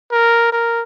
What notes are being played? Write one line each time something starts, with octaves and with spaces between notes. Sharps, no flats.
A#4
A#4